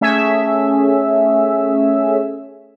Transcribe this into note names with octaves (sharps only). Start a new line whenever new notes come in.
A3 C#4 G#4 E5